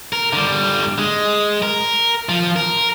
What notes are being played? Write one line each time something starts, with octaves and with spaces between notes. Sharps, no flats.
A#4
D3 G3
G#3
A#4
F3
A#4